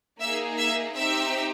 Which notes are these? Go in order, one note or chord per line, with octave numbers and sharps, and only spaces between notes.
A#3 D#4 G#4 E5 E6
E5 E6
C4 D#4 G4 E5 E6